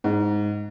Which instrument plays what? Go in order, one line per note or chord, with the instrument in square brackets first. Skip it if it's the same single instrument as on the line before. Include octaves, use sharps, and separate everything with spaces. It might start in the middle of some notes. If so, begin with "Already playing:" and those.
[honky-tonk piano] G#2